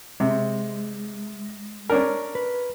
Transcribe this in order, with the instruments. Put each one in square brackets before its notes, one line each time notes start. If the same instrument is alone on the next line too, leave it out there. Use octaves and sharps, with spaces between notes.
[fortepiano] C3 [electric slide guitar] G#3
[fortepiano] C#4 D4 A#4
[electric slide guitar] B4